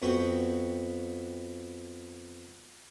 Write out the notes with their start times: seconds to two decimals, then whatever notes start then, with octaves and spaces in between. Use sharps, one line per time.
0.02 F2 B3 F#4 G5